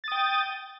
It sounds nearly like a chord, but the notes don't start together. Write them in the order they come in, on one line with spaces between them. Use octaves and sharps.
A6 D#6 G5